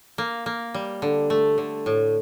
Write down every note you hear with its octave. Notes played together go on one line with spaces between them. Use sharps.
A#3
A#3
G3
D3
A3
D3
A2